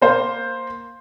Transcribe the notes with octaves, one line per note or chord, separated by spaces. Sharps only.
A#3 C5 F5